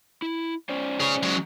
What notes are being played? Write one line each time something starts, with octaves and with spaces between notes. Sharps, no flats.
E4
C#4 C5 D5
G#4 C#5
F#3 G#3